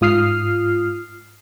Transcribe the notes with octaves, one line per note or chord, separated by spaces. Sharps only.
G#2 F4 D#6 F6 C7